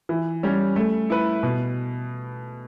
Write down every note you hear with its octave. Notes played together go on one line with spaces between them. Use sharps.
E3
G3 C#4
A3
E4 B4
B2